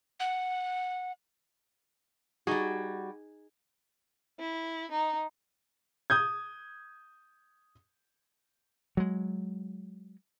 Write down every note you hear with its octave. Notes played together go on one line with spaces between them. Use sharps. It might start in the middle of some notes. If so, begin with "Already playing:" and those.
F#5
G3 D#4 F#4 G#4
E4
D#4
D#6 G6 G#6
F#3 G#3